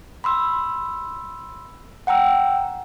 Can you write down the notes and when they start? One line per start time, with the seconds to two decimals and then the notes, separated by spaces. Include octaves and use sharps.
0.24 B5 C6 E6
2.07 F#5 G5 A#5 E6